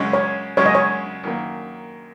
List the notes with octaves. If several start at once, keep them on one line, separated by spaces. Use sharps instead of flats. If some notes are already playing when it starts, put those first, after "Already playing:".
Already playing: F#2 C#3 G#3 C#4
C#5
F#2 C#3 G#3 C#4 C#5
D#5
C#5
F#2 D#3 A#3